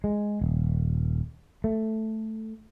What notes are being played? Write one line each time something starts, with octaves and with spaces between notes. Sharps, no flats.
G#3
D#1
A3